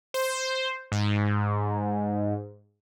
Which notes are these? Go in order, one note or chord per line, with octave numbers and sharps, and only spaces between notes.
C5
G#2